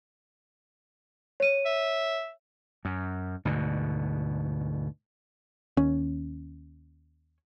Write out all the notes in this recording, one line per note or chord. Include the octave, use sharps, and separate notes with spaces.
C#5 D#7
E5
F#2
D2 G#2 B2
D#2 C#4